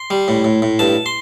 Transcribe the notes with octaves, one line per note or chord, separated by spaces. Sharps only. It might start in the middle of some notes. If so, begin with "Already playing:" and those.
Already playing: C6
G3
A2
A2
A2
G2 A5
C6